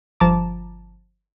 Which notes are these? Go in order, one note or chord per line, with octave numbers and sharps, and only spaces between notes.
G1 F3 A5 A#5 D6